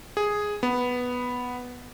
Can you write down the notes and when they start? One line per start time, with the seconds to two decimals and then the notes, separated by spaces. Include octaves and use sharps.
0.17 G#4
0.63 B3